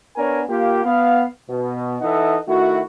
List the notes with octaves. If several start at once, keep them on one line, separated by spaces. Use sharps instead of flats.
B3 D4 A#4 C#5 G#5
A#3 F4 G4
B3 F5
B2
E3 D#4 A4 D#5 E5 F#5
D#3 A3 E4 F#4